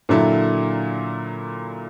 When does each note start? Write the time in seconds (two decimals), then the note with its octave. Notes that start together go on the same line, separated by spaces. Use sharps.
0.09 A#2 D3 F#3 E4 A4